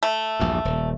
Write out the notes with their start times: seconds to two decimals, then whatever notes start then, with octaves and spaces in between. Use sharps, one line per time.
0.03 A3
0.40 A#1 E2 G2
0.65 D#1